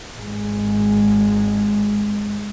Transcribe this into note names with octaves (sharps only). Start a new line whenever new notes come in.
G#1 G#3